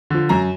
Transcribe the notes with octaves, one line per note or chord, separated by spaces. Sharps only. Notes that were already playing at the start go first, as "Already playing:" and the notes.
D3 F3
F#2 A#5